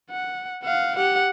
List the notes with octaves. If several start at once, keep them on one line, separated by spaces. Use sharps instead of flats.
F#5
F5 F#5
G4 F#5